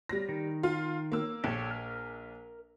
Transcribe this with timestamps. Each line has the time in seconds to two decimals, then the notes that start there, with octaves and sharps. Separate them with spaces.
0.09 G3 A#6
0.29 D#3
0.63 F4
1.12 A#3 E6
1.44 A#1 G4 A4 C#5
1.71 A#4 F6